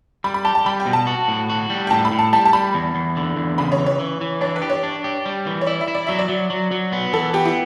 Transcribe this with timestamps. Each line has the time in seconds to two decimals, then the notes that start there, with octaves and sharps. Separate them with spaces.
0.24 G3 B5
0.34 B5
0.45 G4 A5
0.55 A5
0.66 G3 B5
0.80 G5
0.86 B2
0.93 A5
1.07 F#4
1.28 A2
1.50 F#4
1.70 G3
1.87 G5
1.91 A2 A5
2.05 B5
2.12 A2
2.19 A5
2.32 G3 A5
2.45 A5
2.53 G3 B5
2.74 E2
2.95 E2
3.17 D3
3.36 E2
3.58 C#3 B5
3.72 C#5
3.78 E3
3.86 C#5
3.99 E3
4.21 E3
4.41 D4 C#5
4.56 B4
4.62 G4
4.70 C#5
4.83 D4
5.04 G4
5.26 G3
5.46 E3
5.61 C#5
5.67 E4 D5
5.81 E5
5.88 E4
5.95 D5
6.07 F#3 E5
6.19 D5
6.29 F#3
6.50 F#3
6.71 F#3
6.93 B3
7.13 E3 A4
7.33 B3 G4
7.45 E4